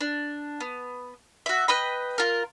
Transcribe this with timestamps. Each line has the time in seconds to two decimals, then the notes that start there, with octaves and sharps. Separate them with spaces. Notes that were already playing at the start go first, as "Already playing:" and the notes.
0.01 D4
0.60 B3
1.46 F#4 E5
1.68 B4 D#5 G5 B5
2.18 F4 A#4